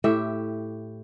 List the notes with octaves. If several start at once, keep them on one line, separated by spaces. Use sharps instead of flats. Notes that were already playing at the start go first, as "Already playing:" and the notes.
A2 G4 E5